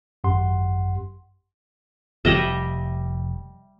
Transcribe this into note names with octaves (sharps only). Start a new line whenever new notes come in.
G#1 F#2 G4 F#5 C6
F1 G3 D#5 E5